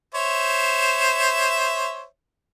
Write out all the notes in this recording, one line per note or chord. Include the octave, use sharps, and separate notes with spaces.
C5 C#5 E5